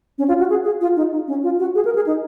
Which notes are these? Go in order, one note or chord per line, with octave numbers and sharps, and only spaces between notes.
C#4
F4
F#4
G#4
G#4
F4
D#4
D#4
C#4
F4
F#4
G#4
A#4
G#4
D#4